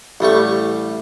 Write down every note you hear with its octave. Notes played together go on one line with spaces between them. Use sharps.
A1 G3 A3 C#6